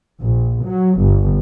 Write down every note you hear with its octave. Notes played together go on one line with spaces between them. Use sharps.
A#1
F#3
G1